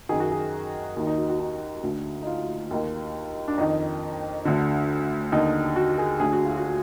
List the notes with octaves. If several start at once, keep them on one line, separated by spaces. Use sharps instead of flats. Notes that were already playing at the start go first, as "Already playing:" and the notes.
F#2 D#3 G#4
F#4
G#4
D#2 D#3 F#4
D#4
F#4
F#4
D#4
D2 D3
D#4
F4
D#2 D#3
D4
F2 D#3 D#4
D2 D3
D#2 D3 D#4
F#4
F#4
G#4
D2 D3 G#4
F#4
F4
F#4